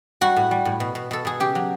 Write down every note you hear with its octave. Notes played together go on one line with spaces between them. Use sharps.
G3 F#4
A2
G3
A2
B2
B2
B2 A4
B2 G#4
C#3 G4
F#3